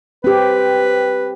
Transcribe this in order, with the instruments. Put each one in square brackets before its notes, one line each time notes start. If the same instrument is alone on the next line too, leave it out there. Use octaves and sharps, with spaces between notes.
[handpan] C4 G4 [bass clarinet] B4